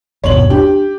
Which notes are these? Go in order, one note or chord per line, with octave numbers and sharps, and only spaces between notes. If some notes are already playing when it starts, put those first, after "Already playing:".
G1 D#2 B2 C#5 F#7
D4 G4